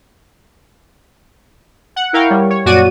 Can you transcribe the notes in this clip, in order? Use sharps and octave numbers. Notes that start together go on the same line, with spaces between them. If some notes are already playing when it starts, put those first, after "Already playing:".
F#5
E4 A#4 F5 G5 C#6
G3 C#5
C#5
F#2 A#2 F#4 D5 D#7